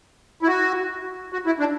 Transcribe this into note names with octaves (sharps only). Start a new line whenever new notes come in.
E4
F#4
F#4
E4
D4